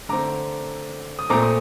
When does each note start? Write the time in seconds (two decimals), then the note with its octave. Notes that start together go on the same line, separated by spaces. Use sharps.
0.09 D3 A3 C4 A#5 D6
1.19 D#6
1.30 A#2 A3 C4 A#5 D6
1.43 D#6